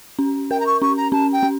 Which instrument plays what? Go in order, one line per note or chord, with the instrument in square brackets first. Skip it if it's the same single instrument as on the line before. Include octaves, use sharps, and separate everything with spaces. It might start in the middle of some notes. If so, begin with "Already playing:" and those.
[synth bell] C#4
[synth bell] A#4 [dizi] G5
[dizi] A#5
C#6
[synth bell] C#4 [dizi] C#6
[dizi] A#5
[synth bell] C#4 [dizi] A5
[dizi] G5
[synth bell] C#4